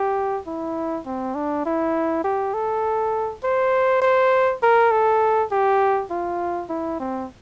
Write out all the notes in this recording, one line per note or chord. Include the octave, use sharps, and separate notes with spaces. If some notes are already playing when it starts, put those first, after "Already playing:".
Already playing: G4
E4
C4
D4
E4
G4
A4
C5
C5
A#4
A4
G4
F4
E4
C4